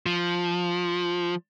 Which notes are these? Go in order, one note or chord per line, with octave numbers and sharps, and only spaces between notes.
F3